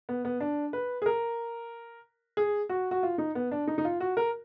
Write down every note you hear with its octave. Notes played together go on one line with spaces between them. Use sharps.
B3
B3
D4
B4
G#4
A#4
G#4
F#4
F#4
F4
D#4
B3
D4
D#4
D#4
F4
F#4
A#4